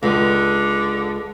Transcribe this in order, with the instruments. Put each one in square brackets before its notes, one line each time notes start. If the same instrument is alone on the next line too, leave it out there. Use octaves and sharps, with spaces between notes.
[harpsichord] C#2 [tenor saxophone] D3